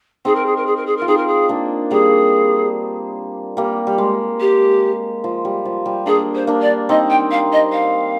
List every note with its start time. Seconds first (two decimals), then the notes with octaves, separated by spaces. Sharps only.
0.25 C4 D#4 G#4
0.35 A#4
0.46 G#4
0.56 A#4
0.66 G#4
0.76 A#4
0.86 G#4
0.97 F4 A#4
1.07 C4 D#4 G#4
1.17 A#4
1.27 G#4
1.49 A#3 D4
1.91 G3 A#3 G#4
3.57 G3 A#3
3.87 G3
3.98 G#3
4.40 G4
5.24 F3
5.45 G3
5.65 F3
5.86 G3
6.06 A#3 D4 G#4
6.35 C5
6.47 A#3 D4
6.61 D5
6.89 C4 D#4 D#5
7.10 G5
7.31 F5
7.52 D#5
7.72 F5